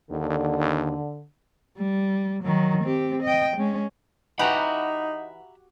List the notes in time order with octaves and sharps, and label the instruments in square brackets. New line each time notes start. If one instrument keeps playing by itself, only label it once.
[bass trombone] D#2 [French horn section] D3
[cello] G3
D#3 F#3
C4 G4
D#5 G5
G#3 C#4
[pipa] E3 F#5 [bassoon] D#4 [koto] F#4 G4 [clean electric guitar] E5 A#5 B5